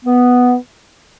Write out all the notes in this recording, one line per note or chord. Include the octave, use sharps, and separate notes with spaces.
B3